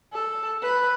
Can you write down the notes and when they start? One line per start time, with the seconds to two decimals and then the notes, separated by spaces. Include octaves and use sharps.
0.13 A4
0.62 B4